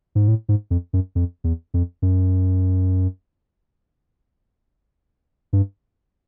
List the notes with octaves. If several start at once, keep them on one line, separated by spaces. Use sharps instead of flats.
G#2
A2
G#2
F2
F#2
F2
E2
F2
F#2
G2